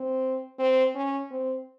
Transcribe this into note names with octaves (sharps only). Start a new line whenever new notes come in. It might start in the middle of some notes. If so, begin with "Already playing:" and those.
Already playing: C4
C4
C#4
C4